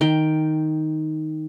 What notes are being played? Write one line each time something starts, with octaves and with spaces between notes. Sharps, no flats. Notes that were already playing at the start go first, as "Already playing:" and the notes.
D#3 G5